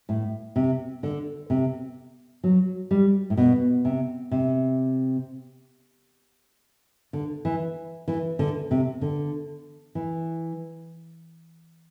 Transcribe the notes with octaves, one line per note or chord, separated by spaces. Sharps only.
A2
C3
D3
C3
F#3
G3
A2
B2
C3
C3
D3
E3
E3
D3
C3
D3
E3